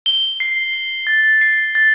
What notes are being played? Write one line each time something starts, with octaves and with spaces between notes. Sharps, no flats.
G7
C7
C7
A6
C7
A6